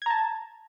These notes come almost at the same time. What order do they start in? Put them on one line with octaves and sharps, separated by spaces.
G#6 A#5 A5